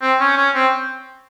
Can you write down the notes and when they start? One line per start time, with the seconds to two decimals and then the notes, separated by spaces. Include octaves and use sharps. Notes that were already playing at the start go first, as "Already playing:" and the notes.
0.02 C4
0.20 C#4
0.37 C#4
0.55 C4